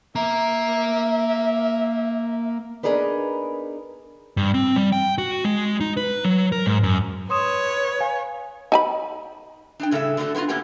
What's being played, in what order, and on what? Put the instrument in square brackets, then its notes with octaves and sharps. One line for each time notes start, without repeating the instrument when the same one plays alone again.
[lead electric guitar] A#3 A#5 [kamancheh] E5
[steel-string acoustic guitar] B3 D4 D#4 G#4 A#4 B4
[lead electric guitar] G2
C4
G3
G5
F#4
G#3
D#4
B4
F#3
A#4
G#2
F#2
[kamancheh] B4 C#5 [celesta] C6 D#6 E7
[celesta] F5 G#5
[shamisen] D#4 G#5 B5
[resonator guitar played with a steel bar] D4 D#4 G5
A2 C#3 G3 A4 E5
D3 A3 D4 F4 F#4 A4
B3 C4 D4 F4 F#4
A2 A#3 B3 C#4 G4